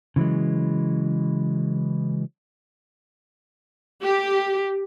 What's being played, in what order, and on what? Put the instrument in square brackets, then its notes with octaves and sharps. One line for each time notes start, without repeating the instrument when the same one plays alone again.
[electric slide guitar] C#3 E3 F#3 G#3
[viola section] G4